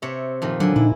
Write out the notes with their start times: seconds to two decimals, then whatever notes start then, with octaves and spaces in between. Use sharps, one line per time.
0.02 C3 C#5 E5
0.42 F2 A#2 D#3
0.60 D3 F#3 G#5
0.76 A#2 D#4 E4